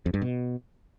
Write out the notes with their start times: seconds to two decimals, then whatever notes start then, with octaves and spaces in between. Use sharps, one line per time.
0.06 F2
0.14 G2
0.22 B2